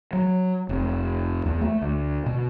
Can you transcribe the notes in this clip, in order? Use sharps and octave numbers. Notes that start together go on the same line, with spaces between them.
F#3
F1
E2
A3
D2
B2